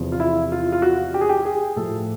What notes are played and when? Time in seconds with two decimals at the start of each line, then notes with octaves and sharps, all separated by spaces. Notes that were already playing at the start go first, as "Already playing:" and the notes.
Already playing: E2 C3 F3
0.12 F4
0.20 E4
0.52 F4
0.72 F4
0.82 F#4
1.14 G4
1.21 G#4
1.29 G4
1.45 G#4
1.76 A2 F3 A4